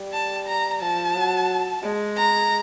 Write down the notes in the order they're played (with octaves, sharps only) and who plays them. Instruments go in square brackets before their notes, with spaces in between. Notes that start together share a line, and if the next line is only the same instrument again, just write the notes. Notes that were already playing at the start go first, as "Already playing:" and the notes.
Already playing: [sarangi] G3
[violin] A5
A#5
[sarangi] F3 [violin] A5
[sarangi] F#3
G#3
[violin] A#5